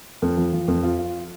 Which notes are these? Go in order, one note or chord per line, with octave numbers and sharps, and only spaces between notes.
F2
F3
F3
F2
F4
F4